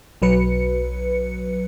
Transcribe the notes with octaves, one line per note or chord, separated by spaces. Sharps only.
B1 F#3 B4 C#7